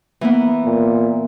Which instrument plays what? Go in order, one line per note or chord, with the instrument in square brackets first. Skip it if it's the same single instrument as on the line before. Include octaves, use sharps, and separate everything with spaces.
[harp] E3 A#3 B3
[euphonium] A#2